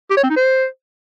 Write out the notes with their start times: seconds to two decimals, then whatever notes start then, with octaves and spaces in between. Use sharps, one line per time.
0.10 G4
0.17 C#5
0.23 C4
0.30 D#4
0.36 C5